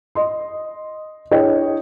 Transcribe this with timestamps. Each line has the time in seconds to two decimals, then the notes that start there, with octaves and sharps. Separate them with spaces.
0.15 D#5 C6
1.31 D4 E4 G#4 C#5 D#5 G5